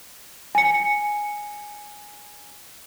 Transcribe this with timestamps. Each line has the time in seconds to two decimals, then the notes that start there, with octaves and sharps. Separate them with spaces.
0.55 G#5 C#7